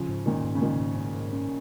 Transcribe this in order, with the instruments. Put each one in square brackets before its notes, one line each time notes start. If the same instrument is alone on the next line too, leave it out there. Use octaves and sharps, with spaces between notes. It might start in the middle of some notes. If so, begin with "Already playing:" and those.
Already playing: [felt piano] C#3 F3
[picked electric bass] G#2
[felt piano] A#2 D#3 [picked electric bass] C#4
[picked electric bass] G#2
[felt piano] C#3
[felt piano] A#2 D#3 [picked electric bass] C#4
[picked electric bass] G#2
C#4
G#2
C#4